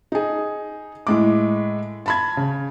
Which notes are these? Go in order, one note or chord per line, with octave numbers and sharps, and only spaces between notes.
D#4 G#4
A2 G#3 D6
A5 B5 G#6
C#3